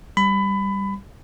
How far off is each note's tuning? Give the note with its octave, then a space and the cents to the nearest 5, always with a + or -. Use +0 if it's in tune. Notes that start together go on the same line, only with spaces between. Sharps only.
G3 +0 B5 +20